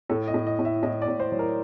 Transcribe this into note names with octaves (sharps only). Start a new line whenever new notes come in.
A2 A4
D#5
A2
D#5
A2
E5
A2 D#5
D5
A2
C5
F#3
A#4